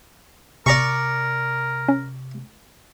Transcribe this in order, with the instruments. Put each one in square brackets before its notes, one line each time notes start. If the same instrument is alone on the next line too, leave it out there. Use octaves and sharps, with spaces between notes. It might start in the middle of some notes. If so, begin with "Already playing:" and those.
[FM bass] C3 [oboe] A#4 [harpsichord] D5 A#5 C#6
[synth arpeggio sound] C#4